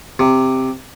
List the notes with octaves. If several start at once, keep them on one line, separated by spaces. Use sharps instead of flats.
C3